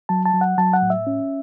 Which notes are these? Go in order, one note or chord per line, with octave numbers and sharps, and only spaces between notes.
F#3 A5
A5
F#3
F#5
F#3 A5
F#5
A2
E5
C#4